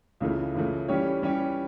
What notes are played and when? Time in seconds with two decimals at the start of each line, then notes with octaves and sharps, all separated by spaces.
0.21 C#2 C#3 E3 A3
0.55 C#2 C#3 E3 A3
0.88 E3 G3 C#4 G4 C#5
1.22 E3 G3 C#4 G4 C#5